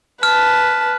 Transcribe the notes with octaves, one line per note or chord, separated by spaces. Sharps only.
B4 A5 F6